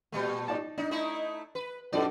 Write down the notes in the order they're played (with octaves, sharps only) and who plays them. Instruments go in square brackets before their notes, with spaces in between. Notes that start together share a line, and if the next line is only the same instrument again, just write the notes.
[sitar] A#2 G3 A3
[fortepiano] D#4 D5 A5
[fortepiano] D4 [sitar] D#4
[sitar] A3 D#4 E4
B4
[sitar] F#2 B2 D5 [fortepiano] D#4 F#4 A4